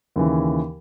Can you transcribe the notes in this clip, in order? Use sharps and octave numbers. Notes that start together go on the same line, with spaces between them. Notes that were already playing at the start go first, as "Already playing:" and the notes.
D#2 C#3 E3